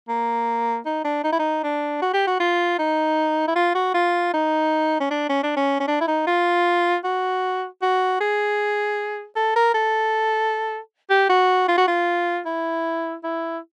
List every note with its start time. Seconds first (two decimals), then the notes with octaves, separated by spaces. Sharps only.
0.08 A#3
0.86 D#4
1.04 D4
1.24 D#4
1.32 E4
1.39 D#4
1.63 D4
2.02 F#4
2.14 G4
2.27 F#4
2.40 F4
2.79 D#4
3.48 E4
3.56 F4
3.75 F#4
3.94 F4
4.34 D#4
5.00 C#4
5.11 D4
5.30 C#4
5.43 D4
5.56 C#4
5.80 C#4
5.88 D4
6.01 E4
6.08 D#4
6.27 F4
7.04 F#4
7.82 F#4
8.20 G#4
9.36 A4
9.56 A#4
9.74 A4
11.10 G4
11.29 F#4
11.68 F4
11.77 F#4
11.88 F4
12.46 E4
13.23 E4